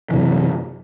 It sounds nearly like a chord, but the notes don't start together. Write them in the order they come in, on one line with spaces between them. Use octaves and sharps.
E3 C3 F#2